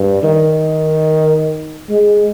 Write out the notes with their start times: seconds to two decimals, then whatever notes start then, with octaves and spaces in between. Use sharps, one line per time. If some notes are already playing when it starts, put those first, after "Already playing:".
Already playing: G2
0.23 D#3
1.89 G#3